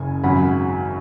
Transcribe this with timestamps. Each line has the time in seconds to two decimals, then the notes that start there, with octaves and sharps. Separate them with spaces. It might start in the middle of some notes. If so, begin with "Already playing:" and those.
Already playing: F#1 C#3 G#5
0.23 G#1 F#2 C#3 F#3 F#5 B5